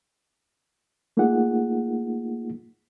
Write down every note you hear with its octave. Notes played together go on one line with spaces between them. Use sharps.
A3 A#3 D#4 F4 G#4 F#5